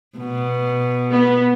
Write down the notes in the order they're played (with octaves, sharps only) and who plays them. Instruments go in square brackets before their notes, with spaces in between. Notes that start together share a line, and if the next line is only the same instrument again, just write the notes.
[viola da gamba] B2
[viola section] B3